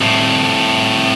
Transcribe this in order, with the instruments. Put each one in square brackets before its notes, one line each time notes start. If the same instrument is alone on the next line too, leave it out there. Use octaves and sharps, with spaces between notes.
[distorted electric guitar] C2 A2